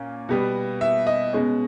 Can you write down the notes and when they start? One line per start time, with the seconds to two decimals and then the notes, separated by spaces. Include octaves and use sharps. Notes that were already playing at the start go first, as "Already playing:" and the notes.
Already playing: A#2 A#3 C#4
0.29 B2 G3 B3
0.81 E5
1.07 D#5
1.33 B2 G#3 C#4